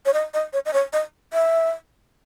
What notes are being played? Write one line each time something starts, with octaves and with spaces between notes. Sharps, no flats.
C#5
D#5
D#5
C#5
D#5
C#5
D#5
E5